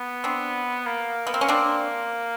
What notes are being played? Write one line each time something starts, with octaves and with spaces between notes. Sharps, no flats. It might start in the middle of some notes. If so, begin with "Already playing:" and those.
Already playing: B3
C4 D4
A#3
B3
C4
C#4
C4 D4